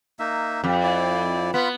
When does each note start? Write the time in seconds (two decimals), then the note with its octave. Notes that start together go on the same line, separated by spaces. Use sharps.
0.19 A#3 D#4 E5
0.64 F2 G4
0.83 E4 D5
1.54 B3 F4 B5